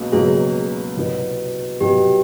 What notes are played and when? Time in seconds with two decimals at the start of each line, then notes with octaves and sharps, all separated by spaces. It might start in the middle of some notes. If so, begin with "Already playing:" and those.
Already playing: C#2 B2 F#3 A#3
0.12 C#2 B2 F#3 A#3 G#4
0.97 C2 B2 F#3 B3
1.80 C2 B2 F#3 B3 G4